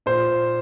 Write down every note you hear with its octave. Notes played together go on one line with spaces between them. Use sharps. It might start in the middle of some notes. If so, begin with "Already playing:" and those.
A#2 C5